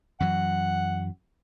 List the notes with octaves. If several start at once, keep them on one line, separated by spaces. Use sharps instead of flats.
F#2 E3 F#3 F#5